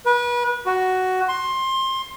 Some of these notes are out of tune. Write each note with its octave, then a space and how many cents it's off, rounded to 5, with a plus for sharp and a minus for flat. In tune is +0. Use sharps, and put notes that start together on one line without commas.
B4 -30
F#4 +10
C6 +20